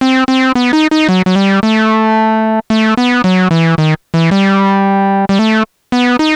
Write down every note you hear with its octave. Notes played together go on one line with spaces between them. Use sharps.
C4
C4
B3
D#4
D#4
F#3
F#3
G3
A3
A3
B3
F#3
E3
D#3
E3
G3
G3
A3
B3
D#4